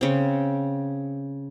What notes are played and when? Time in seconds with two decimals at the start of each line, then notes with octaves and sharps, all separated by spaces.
0.01 C#3 C4